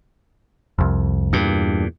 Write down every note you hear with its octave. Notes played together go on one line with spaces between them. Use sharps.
C2 F2
E2 G2 A#2